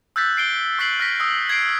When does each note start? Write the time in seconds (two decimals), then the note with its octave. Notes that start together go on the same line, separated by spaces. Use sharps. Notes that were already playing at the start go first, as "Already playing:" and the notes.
0.16 E6 F#6 G6 A6 B6
0.37 C7 D7 G7
0.78 C#6 E6 F#6 B6 C7 F#7
1.00 F6 A#6 B6
1.20 D#6 E6
1.49 G#6 B6 C7 D7